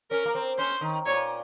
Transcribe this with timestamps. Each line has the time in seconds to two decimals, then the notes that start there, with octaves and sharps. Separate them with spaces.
0.10 C#4 A#4
0.26 A#3
0.35 C4
0.58 C#4 C5
0.81 D#3
1.06 A#2 C#5